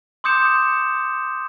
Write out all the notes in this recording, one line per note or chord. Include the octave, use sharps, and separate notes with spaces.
C6 D6 D#6 G6 C#7 E7